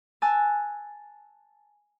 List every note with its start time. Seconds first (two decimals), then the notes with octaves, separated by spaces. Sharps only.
0.22 G#5 A5 E6 F#6